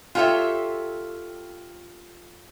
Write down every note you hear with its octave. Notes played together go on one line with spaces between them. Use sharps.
F4 G4 A4 C#5 E5